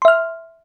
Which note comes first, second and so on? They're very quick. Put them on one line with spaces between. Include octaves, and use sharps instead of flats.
C6 E5 F6